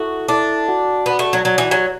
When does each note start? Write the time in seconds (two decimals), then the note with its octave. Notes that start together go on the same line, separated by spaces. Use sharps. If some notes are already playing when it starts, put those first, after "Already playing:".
Already playing: E4 F#4 A4 E5
0.28 D4 E4 A4 E5 A5
0.68 F#4 D5 F#5
1.06 B3 F#4 D5 F#5
1.19 A3
1.33 F#3
1.45 F#3 F#4 D5 F#5
1.58 E3
1.71 F#3